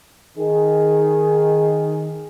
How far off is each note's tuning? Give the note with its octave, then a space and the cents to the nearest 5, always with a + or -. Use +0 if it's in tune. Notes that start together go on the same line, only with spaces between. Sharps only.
D#3 +0 G#4 +5